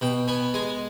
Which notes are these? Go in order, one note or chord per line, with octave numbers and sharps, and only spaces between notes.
B2 G5
B3 G#5
G#3 G#5